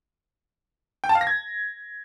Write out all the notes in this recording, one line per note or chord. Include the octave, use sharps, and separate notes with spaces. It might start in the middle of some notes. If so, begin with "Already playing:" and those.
G5
A5
F5
A#6
G#6